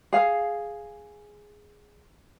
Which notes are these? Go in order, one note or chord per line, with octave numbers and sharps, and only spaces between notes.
G#4 F5